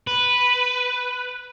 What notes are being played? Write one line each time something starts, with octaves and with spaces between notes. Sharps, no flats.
B4